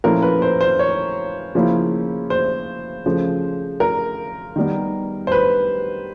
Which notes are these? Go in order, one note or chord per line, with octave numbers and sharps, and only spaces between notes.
A#2 F3 A3 C#4 E4 A#4
B4
C5
C5
C#5
C#3 F3 A#3 C#4 E4
C5
C#3 F3 A3
A#4
D#3 G3 B3
C5
B4